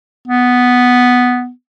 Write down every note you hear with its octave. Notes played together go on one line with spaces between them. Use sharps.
B3